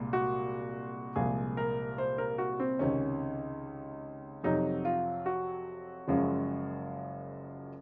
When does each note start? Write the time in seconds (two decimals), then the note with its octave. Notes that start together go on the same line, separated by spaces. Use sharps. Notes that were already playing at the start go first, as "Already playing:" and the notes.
Already playing: C2 A#2 G#3
0.13 F#4
1.16 C2 A#2 F3 G#3 G#4
1.57 A#4
1.98 C5
2.18 A#4
2.38 F#4
2.60 C4
2.79 C#2 C3 D#3 C#4
4.43 F2 C3 F#3 D#4
4.85 F4
5.26 F#4
6.08 F#1 F#2 F3 G#3